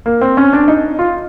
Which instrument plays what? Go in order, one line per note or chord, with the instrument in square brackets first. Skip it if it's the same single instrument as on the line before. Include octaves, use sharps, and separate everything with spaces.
[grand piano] A#3
C4
C#4
D4
D#4
F4